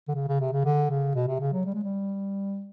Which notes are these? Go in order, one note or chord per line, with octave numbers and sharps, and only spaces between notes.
D3
C#3
C#3
C3
C#3
D3
C#3
B2
C3
C#3
F#3
G3
G#3
G3